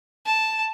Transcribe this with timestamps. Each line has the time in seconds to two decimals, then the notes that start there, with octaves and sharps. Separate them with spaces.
0.25 A5